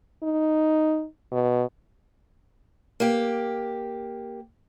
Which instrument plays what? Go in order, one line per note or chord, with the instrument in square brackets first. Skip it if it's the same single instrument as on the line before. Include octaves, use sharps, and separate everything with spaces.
[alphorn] D#4
B2
[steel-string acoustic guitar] A#3 G4